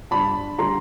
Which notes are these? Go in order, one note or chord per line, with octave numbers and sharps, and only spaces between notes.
G2 A5 B5
D3 G3 A#5 C6